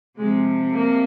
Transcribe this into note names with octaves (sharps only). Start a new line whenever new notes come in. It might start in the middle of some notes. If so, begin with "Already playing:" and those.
C3 F3 G#3
A#3